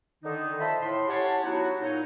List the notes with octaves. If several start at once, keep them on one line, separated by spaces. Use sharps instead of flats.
D3 D#3 D#4
F3 D#5 E5 A5 B5 C6
A2 C6
C#4 G4 C#5 F#5 A5
F#3 B3 D#4 E4 F#4
A#2 D#4 C#5